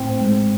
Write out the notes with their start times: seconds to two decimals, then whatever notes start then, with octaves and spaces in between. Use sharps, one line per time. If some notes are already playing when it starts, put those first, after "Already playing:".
Already playing: A2 C4
0.21 G#2